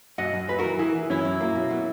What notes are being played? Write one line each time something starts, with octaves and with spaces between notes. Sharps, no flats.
F#2 D#5 F#5
F#2
F#2 B4
F#4 A#4
E3
E3 E4 G#4
E3
F#2 C#4 E4
F#2
A#3
B2
F#3